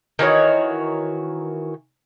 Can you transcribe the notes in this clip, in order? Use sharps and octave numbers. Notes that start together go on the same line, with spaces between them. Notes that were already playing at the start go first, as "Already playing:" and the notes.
D#3 E3 F#4 C#5